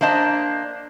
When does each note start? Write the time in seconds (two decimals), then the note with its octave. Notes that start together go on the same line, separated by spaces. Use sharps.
0.01 A#3 D4 C5 D#5 A5